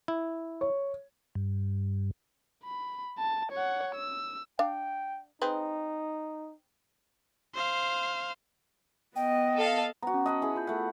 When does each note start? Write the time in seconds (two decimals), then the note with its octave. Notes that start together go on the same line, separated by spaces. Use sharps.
0.08 E4
0.61 C#5
1.35 G2
2.64 B5
3.18 A5
3.52 C#5 F#5
3.95 E6
4.59 D4 F5 G5
5.41 C4 D#4 G#4 B4
7.55 C5 F5
9.16 B3 D#5 G5
9.57 A4 F5
10.03 B3 F#4 A#5
10.14 C#4
10.26 D#5 F#5 A5 B5
10.42 E4 G#4
10.56 F4 B5 G6
10.67 A3 F#5